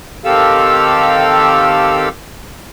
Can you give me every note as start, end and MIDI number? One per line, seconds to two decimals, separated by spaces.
0.25 2.09 51
0.25 2.09 60
0.25 2.09 67
0.25 2.09 69
0.25 2.09 77
0.25 2.09 88